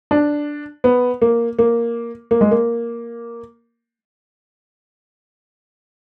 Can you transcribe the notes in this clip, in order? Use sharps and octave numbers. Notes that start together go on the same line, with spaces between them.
D4
B3
A#3
A#3
A#3
G#3
A#3